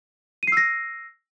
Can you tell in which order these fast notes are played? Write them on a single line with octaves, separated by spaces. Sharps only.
D#7 C7 E6 A#6